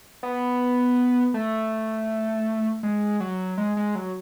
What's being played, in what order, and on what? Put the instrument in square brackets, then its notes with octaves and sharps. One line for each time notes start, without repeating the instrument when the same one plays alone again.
[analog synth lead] B3
A3
G#3
F#3
G#3
G#3
F#3